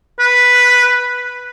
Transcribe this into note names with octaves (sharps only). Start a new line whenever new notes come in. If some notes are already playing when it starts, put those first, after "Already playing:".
B4